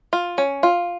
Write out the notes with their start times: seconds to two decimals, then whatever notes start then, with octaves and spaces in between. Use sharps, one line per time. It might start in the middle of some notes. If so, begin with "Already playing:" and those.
0.13 F4
0.38 C#4
0.63 F4